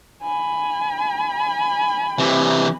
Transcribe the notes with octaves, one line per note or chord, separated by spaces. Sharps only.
G#5 B5
C3 E3